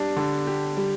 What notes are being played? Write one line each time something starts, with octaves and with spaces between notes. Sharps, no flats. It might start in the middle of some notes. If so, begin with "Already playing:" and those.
Already playing: G3 D4
D3
G4
G3